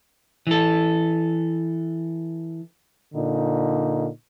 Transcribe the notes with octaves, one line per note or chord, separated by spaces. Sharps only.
E3 A4
A#2 D3 D#4